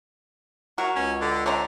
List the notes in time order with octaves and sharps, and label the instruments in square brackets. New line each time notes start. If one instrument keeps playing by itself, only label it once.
[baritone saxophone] F#3 [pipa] F#4 A#4
[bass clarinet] C#2 [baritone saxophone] C#4
[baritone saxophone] D3
[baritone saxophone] D3 [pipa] C#4 C5 A#5